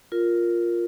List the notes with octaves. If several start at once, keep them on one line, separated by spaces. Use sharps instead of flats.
F4 A#4